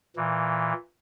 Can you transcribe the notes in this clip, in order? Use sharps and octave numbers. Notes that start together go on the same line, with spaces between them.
A#2 E3